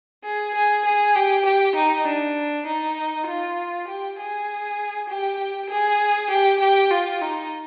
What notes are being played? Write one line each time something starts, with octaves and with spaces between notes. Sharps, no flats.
G#4
G#4
G#4
G4
G4
D#4
D4
D#4
F4
G4
G#4
G4
G#4
G4
G4
F4
D#4